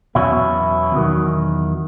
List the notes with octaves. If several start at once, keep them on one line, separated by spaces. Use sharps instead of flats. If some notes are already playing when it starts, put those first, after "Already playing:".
E2 B2 F#3 C#4 E4
E2 D#3 F#3